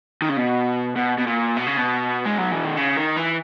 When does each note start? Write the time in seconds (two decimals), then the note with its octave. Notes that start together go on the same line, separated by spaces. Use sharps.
0.22 D#3
0.29 C#3
0.37 B2
0.97 B2
1.18 B2
1.27 A#2
1.56 B2
1.67 C#3
1.77 B2
2.26 G#3
2.38 F#3
2.52 E3
2.64 D#3
2.77 C#3
2.97 D#3
3.17 E3